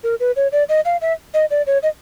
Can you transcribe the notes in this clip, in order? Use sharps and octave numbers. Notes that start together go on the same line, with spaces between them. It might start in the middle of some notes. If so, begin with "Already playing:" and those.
A#4
B4
C#5
D5
D#5
F5
E5
D#5
D5
C#5
D#5